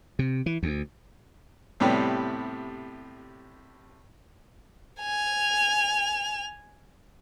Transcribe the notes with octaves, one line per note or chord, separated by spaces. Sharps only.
C3
E3
D2
A2 C3 G3 B3
G#5 F7